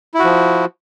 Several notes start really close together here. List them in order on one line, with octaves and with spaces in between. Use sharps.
E4 F#4 F3